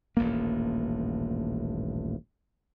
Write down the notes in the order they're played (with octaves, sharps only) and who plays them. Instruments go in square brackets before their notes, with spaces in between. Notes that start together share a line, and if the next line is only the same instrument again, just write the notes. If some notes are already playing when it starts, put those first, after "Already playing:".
[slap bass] D#1 A1 G2 A#3